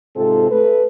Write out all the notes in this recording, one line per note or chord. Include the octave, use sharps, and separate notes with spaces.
G#2 C3 C4 F4 A4
A3 A4 B4